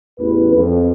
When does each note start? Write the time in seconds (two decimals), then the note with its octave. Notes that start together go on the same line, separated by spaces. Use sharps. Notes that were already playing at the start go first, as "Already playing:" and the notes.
0.20 A1 E2 B4
0.54 F2